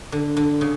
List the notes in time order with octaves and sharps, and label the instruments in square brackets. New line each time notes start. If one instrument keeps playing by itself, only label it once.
[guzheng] D3
D3
C#3